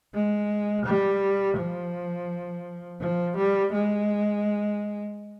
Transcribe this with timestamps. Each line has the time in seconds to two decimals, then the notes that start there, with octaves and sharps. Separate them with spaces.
0.14 G#3
0.86 G3
1.58 F3
3.01 F3
3.37 G3
3.73 G#3